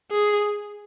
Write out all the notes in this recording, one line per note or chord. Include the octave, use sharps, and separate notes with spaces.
G#4